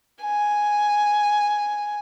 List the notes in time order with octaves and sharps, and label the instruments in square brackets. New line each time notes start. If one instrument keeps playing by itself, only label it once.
[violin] G#5